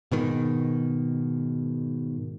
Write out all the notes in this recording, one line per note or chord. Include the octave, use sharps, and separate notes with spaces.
G#2 B2 D#3